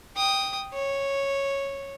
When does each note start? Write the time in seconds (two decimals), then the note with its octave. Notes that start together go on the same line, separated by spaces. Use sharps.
0.16 G5 D#6
0.74 C#5